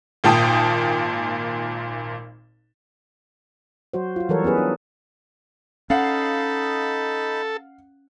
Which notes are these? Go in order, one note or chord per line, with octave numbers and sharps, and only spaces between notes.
G#1 A#2 G5 A5 D#6
F#3 F#4 C5
F4 F#4
E3 F#3 G3 A4 A#4 C#5
B3 C#4 G#4 B4
D4
C#4 D#4 A4 D#5 F5 F#5 B5